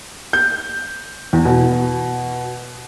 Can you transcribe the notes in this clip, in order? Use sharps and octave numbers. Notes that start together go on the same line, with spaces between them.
G6
E2
B2